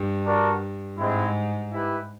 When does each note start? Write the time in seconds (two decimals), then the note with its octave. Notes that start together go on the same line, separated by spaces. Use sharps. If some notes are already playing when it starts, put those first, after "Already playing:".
Already playing: G2
0.25 D4 F#4 A#4 D5
0.98 G#2 G#3 C4 E4
1.72 E4 G4 B4